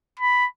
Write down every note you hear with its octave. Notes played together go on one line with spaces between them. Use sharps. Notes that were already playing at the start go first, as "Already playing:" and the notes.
B5